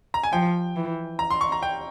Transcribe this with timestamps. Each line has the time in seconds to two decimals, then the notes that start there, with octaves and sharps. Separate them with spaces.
0.14 A#5
0.23 G#5
0.32 F3 G5
0.76 E3
1.19 A#5
1.30 C6
1.41 C#6
1.52 A#5
1.63 G5